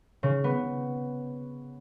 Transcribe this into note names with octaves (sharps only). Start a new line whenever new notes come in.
C#3
B3